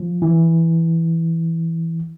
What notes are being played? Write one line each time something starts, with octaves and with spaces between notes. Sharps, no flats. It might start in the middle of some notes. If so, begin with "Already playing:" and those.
Already playing: F3
E3